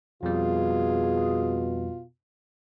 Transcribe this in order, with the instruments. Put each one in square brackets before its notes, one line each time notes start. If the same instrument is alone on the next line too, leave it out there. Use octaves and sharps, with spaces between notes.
[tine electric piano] F2 G3 [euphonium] B2 [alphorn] F4 [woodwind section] G#4